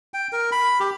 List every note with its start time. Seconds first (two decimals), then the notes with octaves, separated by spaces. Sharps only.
0.14 G5
0.32 A#4
0.52 B5
0.80 G4